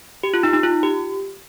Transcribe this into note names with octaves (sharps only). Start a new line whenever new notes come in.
G4
F4
D#4
D#4
F4
G4